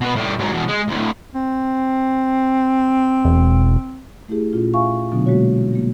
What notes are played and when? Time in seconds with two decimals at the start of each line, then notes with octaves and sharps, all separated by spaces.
0.01 B2 B4
0.16 A2 G3
0.39 G#2 F#3
0.51 E2 B2
0.68 G#3
0.88 D2 A2
1.35 C4
3.25 E1
4.28 A3 E4 G4 G#4
4.53 A#2 C#4 F4
4.73 E5 F5 G#5 C#6
5.12 B2 D3 F#3 B3 D4
5.26 G#3 A#3 F#4 C#5
5.71 G3 A#3